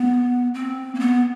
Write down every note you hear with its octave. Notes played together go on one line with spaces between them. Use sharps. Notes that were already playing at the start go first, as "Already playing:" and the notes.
Already playing: B3
C4
A#3
B3